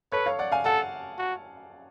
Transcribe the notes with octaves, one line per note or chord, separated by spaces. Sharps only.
A4 B4 C#5
C#5 F5
D5 F#5
F5 G#5
A4 F#5 A5
F#4